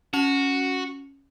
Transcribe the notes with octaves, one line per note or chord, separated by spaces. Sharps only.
C#4 F#4 F7